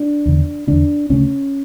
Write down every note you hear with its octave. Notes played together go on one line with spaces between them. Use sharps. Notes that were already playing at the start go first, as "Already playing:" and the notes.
Already playing: D4
E2 D3
E2 D3 D4
D2 C#3 C#4